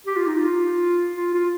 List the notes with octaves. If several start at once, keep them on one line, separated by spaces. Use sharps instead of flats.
G4
F4
D#4
F4
F4
F4